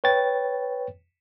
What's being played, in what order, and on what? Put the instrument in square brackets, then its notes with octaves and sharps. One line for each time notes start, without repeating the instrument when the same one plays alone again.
[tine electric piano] B4 C#5 G5 A6